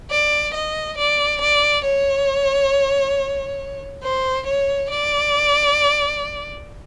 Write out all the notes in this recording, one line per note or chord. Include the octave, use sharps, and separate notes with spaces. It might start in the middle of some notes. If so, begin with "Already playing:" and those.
D5
D#5
D5
D5
C#5
C5
C#5
D5